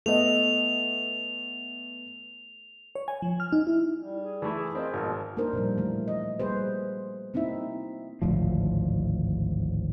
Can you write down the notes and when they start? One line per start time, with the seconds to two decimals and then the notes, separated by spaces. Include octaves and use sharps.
0.06 A3 B3 A4 D#5 F7
2.95 C#5
3.08 G#5
3.22 F3
3.40 F6
3.52 D#4
3.67 E4
4.01 G3
4.21 G#4
4.42 E3 A3 E4
4.57 G#4
4.75 C4 F4 A#4 D#5
4.93 G#1 B2 F3 A#4
5.37 A#3 D4 D#4 A#4 C5
5.53 A#2 F3 G3
5.78 E3 A3
6.08 D#5
6.40 G3 A#3 G#4 B4 C5
7.34 A#3 C4 D#4 E4 E5
8.22 G#1 D2 A2 F3